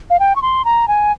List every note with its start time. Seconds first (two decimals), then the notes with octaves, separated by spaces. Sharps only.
0.10 F5
0.20 G5
0.36 C#6
0.42 C6
0.65 A#5
0.88 G#5